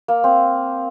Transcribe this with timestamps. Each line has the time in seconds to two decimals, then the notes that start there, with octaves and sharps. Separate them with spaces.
0.08 A#3
0.24 C4